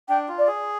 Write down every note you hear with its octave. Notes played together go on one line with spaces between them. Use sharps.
D4 G5
F4
D5
G#4